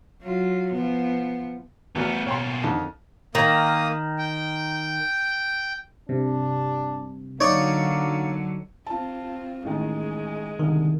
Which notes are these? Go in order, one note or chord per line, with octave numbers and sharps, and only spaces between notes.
F#3 F4
F3 B3
E2 A3 B3 F#4 A#4
B2 A#3 C#5 G5 C6
F2 D3 D#3
D#3 A#3 D#6
G5
G2 C3 D4
D3 F#3 A#3 D#4 C#5 D5 C#7
C4 F4 A5
A1 D#3 G#3
C2 D3 D#3